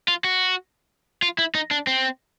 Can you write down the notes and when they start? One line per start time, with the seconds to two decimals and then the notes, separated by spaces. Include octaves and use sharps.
0.08 F4
0.24 F#4
1.22 F4
1.38 E4
1.55 D#4
1.71 D4
1.87 C4